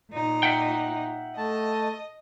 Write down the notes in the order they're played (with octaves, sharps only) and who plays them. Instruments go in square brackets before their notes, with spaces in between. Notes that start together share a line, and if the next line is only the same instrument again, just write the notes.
[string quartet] A#2 D#4
[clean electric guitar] E5 F#5 G5
[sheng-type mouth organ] A3 A5 [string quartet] D#5